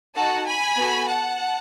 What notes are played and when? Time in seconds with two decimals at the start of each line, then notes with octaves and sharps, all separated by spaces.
0.15 D#4 F#4 A4 F#5 A5
0.46 G#5 B5
0.76 B3 F#4 A4
1.07 F#5 A5